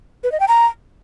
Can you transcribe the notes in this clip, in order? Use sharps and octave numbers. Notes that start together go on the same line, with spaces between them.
B4
D#5
G5
A#5